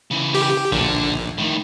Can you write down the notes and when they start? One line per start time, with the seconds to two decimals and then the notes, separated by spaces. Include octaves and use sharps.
0.11 C#3 E3
0.35 G4
0.72 A#1 D3
1.38 A2 D#3